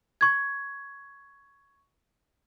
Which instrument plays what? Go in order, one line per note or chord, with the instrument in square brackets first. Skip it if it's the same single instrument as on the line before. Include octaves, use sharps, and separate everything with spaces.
[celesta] C#6 G#6